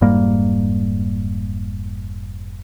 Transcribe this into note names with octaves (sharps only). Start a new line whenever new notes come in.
F1 G#2 G3 A#3